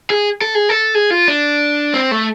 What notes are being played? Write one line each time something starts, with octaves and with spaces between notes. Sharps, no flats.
G#4
A4
G#4
A4
G#4
F4
D4
C4
A3